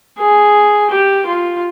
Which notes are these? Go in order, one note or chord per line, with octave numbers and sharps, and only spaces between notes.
G#4
G4
F4